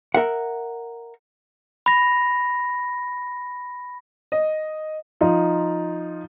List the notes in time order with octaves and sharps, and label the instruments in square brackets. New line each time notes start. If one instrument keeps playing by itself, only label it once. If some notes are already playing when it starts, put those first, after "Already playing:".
[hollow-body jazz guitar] A#4 E5 F#5
[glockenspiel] B5 A#6
[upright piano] D#5
F3 D#4 F4